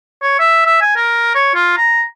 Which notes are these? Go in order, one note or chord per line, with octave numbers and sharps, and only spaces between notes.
C#5
E5
E5
G#5
A#4
C#5
F4
A#5